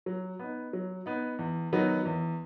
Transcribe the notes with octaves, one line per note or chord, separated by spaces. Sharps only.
F#3
B3 D#4
F#3
B3 D#4
E2
D#3 F#3 B3 D#4
E2